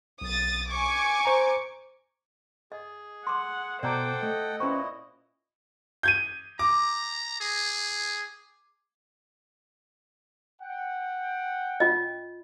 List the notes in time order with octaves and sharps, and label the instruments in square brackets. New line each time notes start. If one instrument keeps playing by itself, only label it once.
[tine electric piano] B1 [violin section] D#6 A6
[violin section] G#5 C#6 D6
[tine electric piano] C5 A#5
[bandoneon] G#4 [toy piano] D#5
[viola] F#5 [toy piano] C6 D6
[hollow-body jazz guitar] B2 [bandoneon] A4 F#5 G5 [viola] C5 D6 [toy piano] D5 A#5
[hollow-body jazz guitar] A3 [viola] D#5
[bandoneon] A#2 E4 [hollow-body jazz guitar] C#4 B4 C5 [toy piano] C#6
[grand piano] G6 G#6 D#7
[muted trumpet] A#5 [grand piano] D6
[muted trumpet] G#4
[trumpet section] F#5 G5
[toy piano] F4 D#5